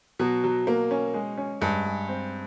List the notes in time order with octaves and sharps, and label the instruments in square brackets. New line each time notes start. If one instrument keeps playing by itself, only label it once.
[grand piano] B2 [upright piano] F#3
[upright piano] F#3
A#3
C#4
G#3
C#4
[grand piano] G2 [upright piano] G#3
[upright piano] G#3
C4